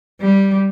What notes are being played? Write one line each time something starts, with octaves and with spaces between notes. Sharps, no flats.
G3